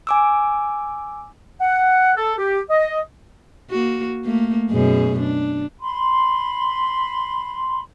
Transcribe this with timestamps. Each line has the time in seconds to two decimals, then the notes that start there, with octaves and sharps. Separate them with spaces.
0.07 G#5 D6 E6
1.61 F#5
2.17 A4
2.38 G4
2.70 D#5
3.70 A#3 F#4
4.25 A3 A#3
4.71 F#2 B2 G#4
5.20 D4
5.80 B5 C6